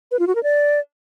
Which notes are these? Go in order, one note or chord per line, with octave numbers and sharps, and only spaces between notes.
B4
F4
F#4
A#4
D5